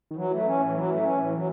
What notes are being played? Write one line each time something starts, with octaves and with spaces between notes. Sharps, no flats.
D#3
E3 F#3
A3
C#4
A2
F#3
A3
C#4
A2
F#3